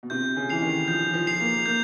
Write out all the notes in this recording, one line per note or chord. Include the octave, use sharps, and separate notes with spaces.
B2
C3 G6
C#3
E3 C7 F7
D#3
F3 G6
F3
C7 F7
A#3
A#3 G6